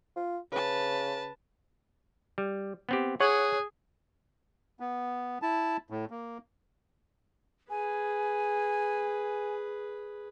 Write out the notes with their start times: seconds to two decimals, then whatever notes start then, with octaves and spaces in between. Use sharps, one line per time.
0.16 F4
0.52 C#3 B4 A5
2.38 G3
2.89 B3 C4 G4
3.21 G#4 C#5 F#5 F#6
4.80 B3
5.42 E4 A5
5.90 A2
6.10 A#3
7.70 G#4 B4 G#5